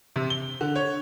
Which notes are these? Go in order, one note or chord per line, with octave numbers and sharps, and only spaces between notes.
C3
G7
D3
C#5